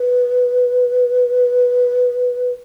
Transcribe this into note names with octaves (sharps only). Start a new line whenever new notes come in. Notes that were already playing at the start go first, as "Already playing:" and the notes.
Already playing: B4